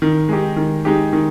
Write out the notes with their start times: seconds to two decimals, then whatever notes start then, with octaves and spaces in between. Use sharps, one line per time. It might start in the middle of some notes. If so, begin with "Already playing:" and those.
0.02 D#3
0.29 G#3 D#4 G4
0.56 D#3
0.85 G#3 D#4 G4
1.13 D#3